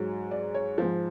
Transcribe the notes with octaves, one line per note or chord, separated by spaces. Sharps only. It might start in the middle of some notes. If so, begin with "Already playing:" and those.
Already playing: G#2 F#3
D5
C#5
G#2 F3